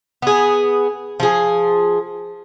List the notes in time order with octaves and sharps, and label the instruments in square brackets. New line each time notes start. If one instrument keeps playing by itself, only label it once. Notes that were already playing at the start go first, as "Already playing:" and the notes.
[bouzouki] B3 G#4
F3 G#4